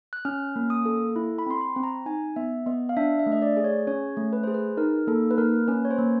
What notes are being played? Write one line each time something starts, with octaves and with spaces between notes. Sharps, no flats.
F#6
C#4 F6
A#3
D#6
A4
E4
B5
C4 C6
B5
C4
A#5
D#4 G#5
B3 E5
B3 D#5
F5
D4 E5
E5
A3
D#5
D5
G#4
C#5
C#4 C#5
A3
B4
G#4 C5
B4
D#4 A#4
A#3 A4
B4
A#3 A#4
C#4 B4
C#5
C5
A#3